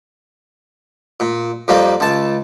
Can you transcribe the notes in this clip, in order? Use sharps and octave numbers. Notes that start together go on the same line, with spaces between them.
A#2
F2 G3 A#3
C#2 A5